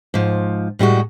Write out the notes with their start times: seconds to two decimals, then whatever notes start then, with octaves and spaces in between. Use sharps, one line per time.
0.14 G#2 F3
0.79 A2 G3 G#3 F#4